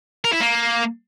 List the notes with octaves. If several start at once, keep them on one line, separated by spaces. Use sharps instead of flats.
A#4
E4
A#3